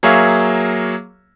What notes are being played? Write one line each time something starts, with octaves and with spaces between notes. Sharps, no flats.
F#3 A#3 G#4 C#5 E5 F5